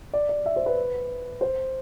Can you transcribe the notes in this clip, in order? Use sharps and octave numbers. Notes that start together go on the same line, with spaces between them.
D5
D5
E5
C5
B4
C5